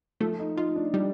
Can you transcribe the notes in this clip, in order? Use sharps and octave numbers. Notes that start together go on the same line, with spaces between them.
F3 A3
D#4
D#4 F4
D4
G3 D4